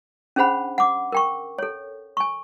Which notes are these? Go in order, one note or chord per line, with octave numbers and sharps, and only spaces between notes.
C#4 D4 G#4 C5 F#5 B5
F#5 D6
A#4 G5 C#6
A4 C#5
G#5 C#6